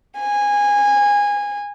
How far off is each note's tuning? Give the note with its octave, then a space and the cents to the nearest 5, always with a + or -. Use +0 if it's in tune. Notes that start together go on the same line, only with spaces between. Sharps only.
G#5 -20